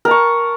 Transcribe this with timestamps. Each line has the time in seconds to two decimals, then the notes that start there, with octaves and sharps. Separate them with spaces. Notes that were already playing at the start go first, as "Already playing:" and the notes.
0.05 A#4
0.08 A5
0.11 C#6